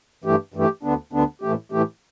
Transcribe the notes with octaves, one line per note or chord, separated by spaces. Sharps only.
G2 E3 A3 G4
G2 E3 A3 G4
D2 D3 B3 D4
D2 D3 B3 D4
A2 E3 A3 G4
A2 E3 A3 G4